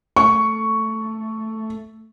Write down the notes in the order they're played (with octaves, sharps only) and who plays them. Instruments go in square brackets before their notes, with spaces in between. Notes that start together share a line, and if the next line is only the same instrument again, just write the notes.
[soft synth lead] A3 [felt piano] C#6